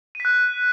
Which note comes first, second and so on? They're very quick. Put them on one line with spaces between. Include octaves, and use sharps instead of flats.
D#7 B6 F#6